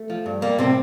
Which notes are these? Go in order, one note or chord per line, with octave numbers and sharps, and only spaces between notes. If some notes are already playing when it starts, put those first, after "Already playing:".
Already playing: A3
F3
G2
G3 A#3
A2 C3 C4